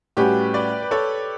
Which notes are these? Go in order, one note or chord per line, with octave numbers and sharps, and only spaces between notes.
A2 G3 C#4 F#4 G4 B4
B4 D5
B4
A4 C#5